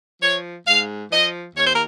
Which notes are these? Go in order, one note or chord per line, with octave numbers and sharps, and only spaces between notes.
F3 C#5
G#2 F5
F3 D#5
D#2 C#5
C5
A#4